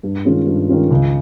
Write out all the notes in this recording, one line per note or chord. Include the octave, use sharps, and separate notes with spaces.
G2
D#3 G#3 C#4 F4
G2
D#3 G#3 C#4 F4
C#2